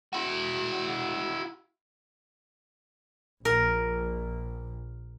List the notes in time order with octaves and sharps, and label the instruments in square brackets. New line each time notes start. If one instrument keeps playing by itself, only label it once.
[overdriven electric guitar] E4 F#4
[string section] A#1 [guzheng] A#4